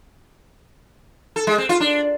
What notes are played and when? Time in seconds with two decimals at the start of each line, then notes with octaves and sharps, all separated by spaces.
1.36 A4
1.47 G#3
1.58 C4
1.69 F4
1.80 D4